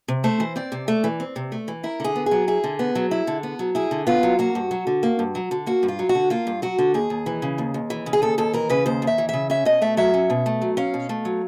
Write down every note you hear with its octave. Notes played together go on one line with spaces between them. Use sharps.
C3
A3 C5
E3
C4 D5
C3
A3
E3
C4
C3
A3
E3
E4 A#4
D3 G#4
B3
G#4
F#3
E4 G#4
D3
B3
F#3
E4
D3
B3
F#3
E4 G#4
D3
B3 F4
F#3
A#3 F#4
G2
F#3
D3
A#3
G2
F#3
D3
A#3 F#4
G2
F4
F#3
F#4
D3
A#3 F4
G2
F#3 F#4
D3
D#2 G#4
D#2
E3
C#3
D#2
D#2
E3
C#3
G#4
D#2 A4
D#2 A4
E3 A#4
C#3 B4
D#2 C5
D#2
E5
E3
C#3 E5
C#4 E5
B2 D#5
A3 E5
F#3 E5
C#4
B2
A3
F#3
C#4 F5
B2
A3
F#3